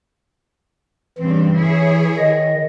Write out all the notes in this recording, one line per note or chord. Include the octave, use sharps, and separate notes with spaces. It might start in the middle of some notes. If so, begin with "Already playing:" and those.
G2 C#3 E3 C4
E4 G#4 C#5
D#3 D#5